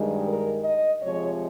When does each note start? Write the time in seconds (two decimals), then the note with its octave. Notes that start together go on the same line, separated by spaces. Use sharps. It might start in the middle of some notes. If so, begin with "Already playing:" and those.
Already playing: G2 D#3 G#3
0.25 A#4
0.64 D#5
1.03 C3 F3 G#3 C#5